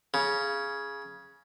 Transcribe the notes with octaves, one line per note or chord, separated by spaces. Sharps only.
C#3